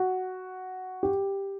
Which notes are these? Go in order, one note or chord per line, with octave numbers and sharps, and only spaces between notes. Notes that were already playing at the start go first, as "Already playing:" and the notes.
Already playing: F#4
G4